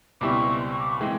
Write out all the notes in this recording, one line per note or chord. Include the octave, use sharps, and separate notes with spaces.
C#2 B2 G3 C4 E4 C#6 D6
C6
C#6
D6
C#6
E3 G#3 C4 G5